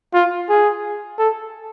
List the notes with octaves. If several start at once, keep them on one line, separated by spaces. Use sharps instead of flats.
F4
G#4
A4